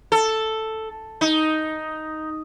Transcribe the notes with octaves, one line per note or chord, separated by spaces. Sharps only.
A4
D#4